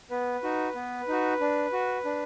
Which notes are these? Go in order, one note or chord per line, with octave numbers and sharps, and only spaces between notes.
B3 B4
D#4 F#4
B3
D#4 F#4
D4
F#4
D4